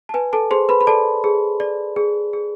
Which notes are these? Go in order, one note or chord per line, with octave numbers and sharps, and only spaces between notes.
A5
B4 G#5
A4 A5
G#4 C5 C6
B4 B5
B5
A4 D5 A5
G#4
D5
G#4
G#4